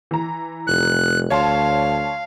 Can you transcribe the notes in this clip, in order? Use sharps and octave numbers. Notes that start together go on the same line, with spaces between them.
E3 A#5
F1 F#6
D2 C#5 F5 A5 C6